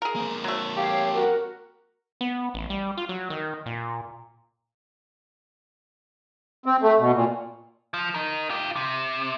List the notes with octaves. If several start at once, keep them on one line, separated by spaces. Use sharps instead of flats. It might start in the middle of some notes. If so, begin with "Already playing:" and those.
G#4 A#4
A#3 C4
F#3 A3
G4 C#5 F5
F#4 A#4
B3
A1
G3
F4
F#3
D#3
A#2
C4
A3
B2
A#2
F3
D#4 A#4
F4 G4
C3